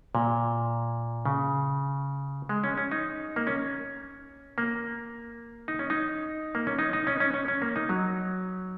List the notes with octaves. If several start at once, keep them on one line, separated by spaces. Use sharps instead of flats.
A#2
C#3
G#3
C#4
C#4
D#4
A#3
C#4
A#3
D#4
C#4
D#4
A#3
C#4
D#4
D#4
C#4
C#4
C#4
C#4
A#3
D#4
F#3